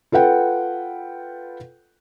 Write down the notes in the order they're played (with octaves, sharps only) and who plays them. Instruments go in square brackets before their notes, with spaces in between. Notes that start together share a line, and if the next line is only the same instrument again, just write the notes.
[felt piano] F4 A4 B4 F#5 G5